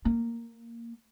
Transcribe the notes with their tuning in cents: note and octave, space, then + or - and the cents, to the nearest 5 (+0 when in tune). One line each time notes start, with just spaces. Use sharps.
A#3 -5